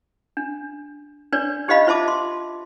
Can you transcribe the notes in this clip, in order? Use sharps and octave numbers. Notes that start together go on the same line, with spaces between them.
D4
D4 B4 C#5 D5
D#4 G4 C5 D#5 F5 B5
F4 C5 E5 A5 D6
C6